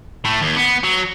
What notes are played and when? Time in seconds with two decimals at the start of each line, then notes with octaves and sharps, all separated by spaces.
0.25 A2 A3
0.42 D#2
0.56 B3
0.83 F#3